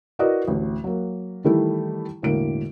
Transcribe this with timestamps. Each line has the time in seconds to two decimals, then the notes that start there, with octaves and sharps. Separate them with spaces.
0.19 E4 F#4 A#4 B4 D5 D#5
0.48 A1 D2
0.84 F#3 A#3
1.44 D#3 E3 G3 A3 E4 G4
2.22 E1 A2 D3 A#3 D7